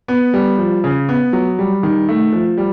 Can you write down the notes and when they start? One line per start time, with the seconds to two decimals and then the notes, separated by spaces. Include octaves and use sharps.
0.08 B3
0.34 G3
0.58 F3
0.84 C#3
1.09 B3
1.33 F#3
1.59 G3
1.83 D#3
2.09 A3
2.33 F3
2.58 G3